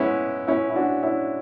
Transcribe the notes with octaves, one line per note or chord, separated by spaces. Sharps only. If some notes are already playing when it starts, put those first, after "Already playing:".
Already playing: G#3 B3 C#4 E4
C#4 E4
E4
D4 F#4
C#4 E4